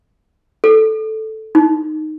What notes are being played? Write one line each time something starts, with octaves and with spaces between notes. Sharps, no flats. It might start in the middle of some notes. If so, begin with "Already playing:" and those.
A4
D#4